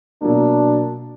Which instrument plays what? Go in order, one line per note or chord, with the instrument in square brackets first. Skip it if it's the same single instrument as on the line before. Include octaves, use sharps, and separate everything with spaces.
[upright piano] B2 F#3 A#3 [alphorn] D4